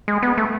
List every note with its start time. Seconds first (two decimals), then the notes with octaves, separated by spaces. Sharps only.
0.08 G#3
0.23 B3
0.38 A3